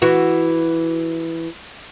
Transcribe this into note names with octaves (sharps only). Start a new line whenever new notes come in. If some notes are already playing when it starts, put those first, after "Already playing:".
E3 F#4